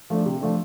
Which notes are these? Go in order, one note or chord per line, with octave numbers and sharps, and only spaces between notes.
F3 A3 D4
C3
F3 A3 D4